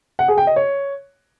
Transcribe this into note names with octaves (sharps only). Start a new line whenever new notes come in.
F#5
G#4
G5
D#5
C#5